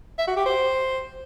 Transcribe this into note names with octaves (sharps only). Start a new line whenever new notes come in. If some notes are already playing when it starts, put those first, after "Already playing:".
E5
F#4
G4
C5